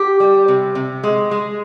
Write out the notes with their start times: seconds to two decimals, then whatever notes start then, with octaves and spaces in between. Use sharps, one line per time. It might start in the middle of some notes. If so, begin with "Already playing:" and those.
Already playing: G4
0.20 G3
0.48 C3
0.75 C3
1.03 G#3
1.31 G#3